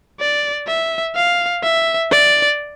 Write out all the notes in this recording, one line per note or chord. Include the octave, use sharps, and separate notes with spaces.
D5
E5
F5
E5
D5